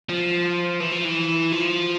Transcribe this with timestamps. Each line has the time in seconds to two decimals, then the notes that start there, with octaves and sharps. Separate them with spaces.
0.09 F3
0.80 E3
0.92 F3
1.05 E3
1.52 F3